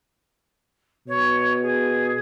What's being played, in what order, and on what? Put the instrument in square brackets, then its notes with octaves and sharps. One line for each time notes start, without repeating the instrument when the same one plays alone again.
[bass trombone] B2 [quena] C#5
[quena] G#4